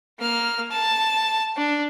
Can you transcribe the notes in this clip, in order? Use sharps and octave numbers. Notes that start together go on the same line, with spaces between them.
A#3 F6
A5
D4